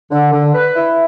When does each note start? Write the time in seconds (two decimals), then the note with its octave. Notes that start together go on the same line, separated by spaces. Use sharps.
0.11 D3
0.32 D3
0.54 B4
0.76 E4